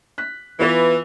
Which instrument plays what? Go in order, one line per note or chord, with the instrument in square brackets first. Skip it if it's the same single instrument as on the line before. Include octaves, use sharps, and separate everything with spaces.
[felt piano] F#6 B6
[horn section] E3 [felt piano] B3 F4 B4